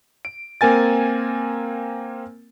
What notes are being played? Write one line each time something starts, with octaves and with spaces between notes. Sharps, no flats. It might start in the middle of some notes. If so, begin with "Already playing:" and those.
D7
A#3 C4 A#4 G#5 A6